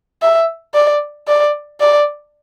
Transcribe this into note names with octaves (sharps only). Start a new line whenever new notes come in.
E5
D5
D5
D5